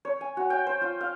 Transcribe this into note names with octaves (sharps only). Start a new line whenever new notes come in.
C#5
G#5
F#4
G5
C5
F4
F5